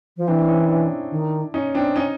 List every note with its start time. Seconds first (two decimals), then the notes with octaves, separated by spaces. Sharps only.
0.17 F3
0.27 E3 C4 D4
0.38 C4 D4
0.48 C#4 D#4
0.59 D4 E4
0.69 D4 E4
1.11 D#3
1.54 C#4 D#4
1.75 C4 D4
1.96 C#4 D#4